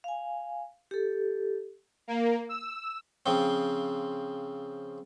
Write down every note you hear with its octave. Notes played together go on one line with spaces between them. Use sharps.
F5 G#5
G4 A4
A#3
E6
C#3 F3 C4